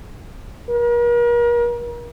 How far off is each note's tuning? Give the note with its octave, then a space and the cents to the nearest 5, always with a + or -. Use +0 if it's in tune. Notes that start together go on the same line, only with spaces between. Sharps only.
A#4 +40